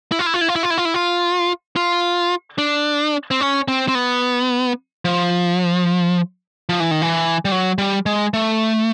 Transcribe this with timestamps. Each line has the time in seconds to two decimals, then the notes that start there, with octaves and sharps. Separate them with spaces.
0.12 E4
0.19 F4
0.26 E4
0.34 F4
0.41 E4
0.49 F4
0.56 E4
0.63 F4
0.70 E4
0.78 F4
0.85 E4
0.94 F4
1.76 F4
2.58 D4
3.31 C4
3.41 C#4
3.68 C4
3.88 C4
3.95 B3
5.05 F3
6.69 F3
6.80 E3
6.91 D#3
7.02 E3
7.45 G3
7.52 F#3
7.78 G3
8.06 G#3
8.34 A3